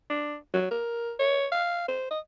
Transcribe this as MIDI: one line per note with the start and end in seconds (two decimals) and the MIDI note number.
0.10 0.37 62
0.54 0.67 54
0.71 1.12 70
1.19 1.47 73
1.52 1.85 77
1.88 2.09 72
2.11 2.19 75